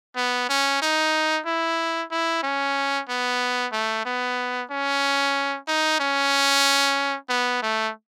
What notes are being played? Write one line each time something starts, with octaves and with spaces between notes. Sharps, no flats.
B3
C#4
D#4
E4
E4
C#4
B3
A3
B3
C#4
D#4
C#4
B3
A3